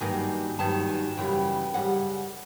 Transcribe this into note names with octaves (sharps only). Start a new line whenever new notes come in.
G2 D#3 F#3 A#3 G#5
G2 D#3 F#3 A#3 A5
G#5
F#2 C#3 E3 G3 G5
F#2 C#3 G3 F#5